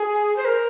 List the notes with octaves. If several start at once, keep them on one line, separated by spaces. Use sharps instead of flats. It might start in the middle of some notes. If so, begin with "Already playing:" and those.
Already playing: G#4
C5
A#4